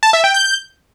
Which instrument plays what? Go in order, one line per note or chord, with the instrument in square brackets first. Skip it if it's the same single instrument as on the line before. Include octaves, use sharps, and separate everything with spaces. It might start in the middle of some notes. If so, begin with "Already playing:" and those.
[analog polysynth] A5
E5
G5
G6